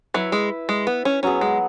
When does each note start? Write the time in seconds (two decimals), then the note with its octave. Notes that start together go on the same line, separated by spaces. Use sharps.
0.14 F#3 E4 B4 E5
0.32 G#3
0.69 G#3
0.87 B3
1.05 C#4
1.23 F#3 B3 C#4 G#4
1.41 G#3